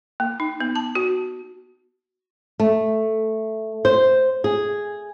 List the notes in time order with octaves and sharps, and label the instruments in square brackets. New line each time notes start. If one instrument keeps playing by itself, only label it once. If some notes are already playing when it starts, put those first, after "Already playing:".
[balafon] A#3
D#4
B3
A5
F#4
[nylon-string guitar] A3
C5
G#4